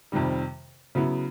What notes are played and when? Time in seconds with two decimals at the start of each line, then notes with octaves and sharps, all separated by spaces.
0.12 F2 C3 D#3 G3
0.95 C#3 F#3 B3 E4